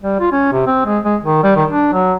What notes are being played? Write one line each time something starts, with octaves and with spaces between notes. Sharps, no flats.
G3
F4
C#4
C3
C4
G#3
G#3
D#3
G3
D#3
D4
F#3